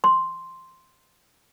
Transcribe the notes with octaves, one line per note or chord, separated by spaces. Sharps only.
C6